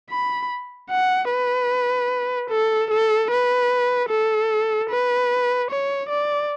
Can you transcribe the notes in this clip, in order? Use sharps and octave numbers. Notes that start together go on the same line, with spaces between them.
B5
F#5
B4
A4
A4
B4
A4
B4
C#5
D5